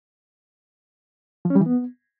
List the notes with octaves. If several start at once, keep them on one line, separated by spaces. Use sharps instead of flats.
F3
C#4
G3
E3
B3